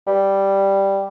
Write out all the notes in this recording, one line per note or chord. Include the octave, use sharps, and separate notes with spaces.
G3